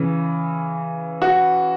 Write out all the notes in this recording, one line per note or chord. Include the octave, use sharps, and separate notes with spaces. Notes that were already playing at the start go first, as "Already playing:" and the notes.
Already playing: C#3 E3
F#4